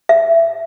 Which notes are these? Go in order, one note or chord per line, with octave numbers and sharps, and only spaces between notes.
E5